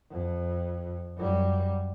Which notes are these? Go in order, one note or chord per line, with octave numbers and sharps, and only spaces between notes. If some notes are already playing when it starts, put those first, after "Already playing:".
F2
F#2 G3